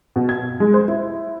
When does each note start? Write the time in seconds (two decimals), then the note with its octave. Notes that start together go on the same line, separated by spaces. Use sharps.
0.16 B2
0.29 G#6
0.60 G#3
0.74 C5
0.88 E4